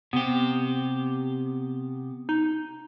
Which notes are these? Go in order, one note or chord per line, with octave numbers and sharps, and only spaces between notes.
C3 B3 G4
D#4